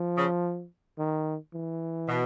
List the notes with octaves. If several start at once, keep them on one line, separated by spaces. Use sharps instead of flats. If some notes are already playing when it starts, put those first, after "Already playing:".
Already playing: F3
C#3
D#3
E3
B2